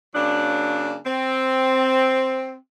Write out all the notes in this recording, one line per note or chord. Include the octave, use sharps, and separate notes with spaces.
C#3 F#3 A#3 D4
C4